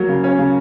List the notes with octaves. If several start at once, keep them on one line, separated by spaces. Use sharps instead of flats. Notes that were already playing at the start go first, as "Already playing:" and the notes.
Already playing: F#3 A#3
C#3
C#4
C#3